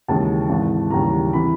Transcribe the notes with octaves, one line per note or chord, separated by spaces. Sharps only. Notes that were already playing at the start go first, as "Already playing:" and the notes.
D#2 C#3 E3 G#3 A5
G#1 G#2 E3
D#2 C#3 E3 G3 A#5
C3 E3 B5